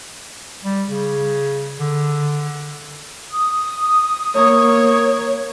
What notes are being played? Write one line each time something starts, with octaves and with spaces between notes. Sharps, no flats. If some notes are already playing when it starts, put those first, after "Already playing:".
G3
C#3
D3
D#6
A#3 C#5